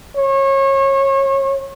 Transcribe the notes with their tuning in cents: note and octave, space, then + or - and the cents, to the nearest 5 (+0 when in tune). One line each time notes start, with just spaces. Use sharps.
C#5 -30